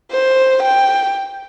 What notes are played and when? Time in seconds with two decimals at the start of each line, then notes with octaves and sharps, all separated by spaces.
0.11 C5
0.62 G5